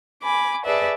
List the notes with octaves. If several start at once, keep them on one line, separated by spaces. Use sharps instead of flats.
G#5 B5 D6
G#4 A4 B4 D5 E5